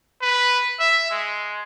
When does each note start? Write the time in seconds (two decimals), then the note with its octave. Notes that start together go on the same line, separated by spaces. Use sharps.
0.22 B4
0.79 E5
1.11 G#3